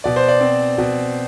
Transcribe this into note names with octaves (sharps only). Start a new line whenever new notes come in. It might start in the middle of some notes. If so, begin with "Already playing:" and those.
B2 D5
C5
D5
C4
B2